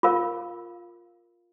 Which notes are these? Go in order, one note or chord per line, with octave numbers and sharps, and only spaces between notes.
F4 A#4 F5